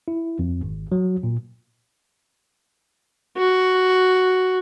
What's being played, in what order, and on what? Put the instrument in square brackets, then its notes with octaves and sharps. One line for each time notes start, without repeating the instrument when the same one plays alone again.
[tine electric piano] E4
F2
G#1
F#3
A#2
[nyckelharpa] F#4